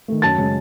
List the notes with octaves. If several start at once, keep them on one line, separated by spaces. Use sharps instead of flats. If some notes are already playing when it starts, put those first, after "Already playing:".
D#3 A3
F#2 A5 A6
C#3 G#3